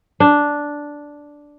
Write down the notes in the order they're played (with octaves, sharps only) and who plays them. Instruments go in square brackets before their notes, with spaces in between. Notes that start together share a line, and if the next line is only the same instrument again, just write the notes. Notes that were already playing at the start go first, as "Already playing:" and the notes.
[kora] D4